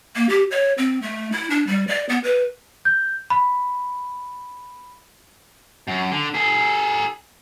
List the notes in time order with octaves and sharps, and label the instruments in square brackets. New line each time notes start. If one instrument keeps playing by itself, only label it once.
[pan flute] A#3
G4
C#5
C4
A3
E4
D4
G3
D5
B3
B4
[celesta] G6
B5
[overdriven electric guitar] F#2
D3
G#4 A4